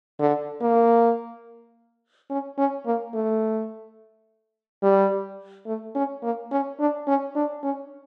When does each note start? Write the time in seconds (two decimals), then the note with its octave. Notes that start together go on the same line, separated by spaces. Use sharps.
0.20 D3
0.62 A#3
2.30 C#4
2.58 C#4
2.86 A#3
3.14 A3
4.83 G3
5.67 A3
5.95 C#4
6.23 A#3
6.52 C#4
6.80 D4
7.07 C#4
7.36 D4
7.64 C#4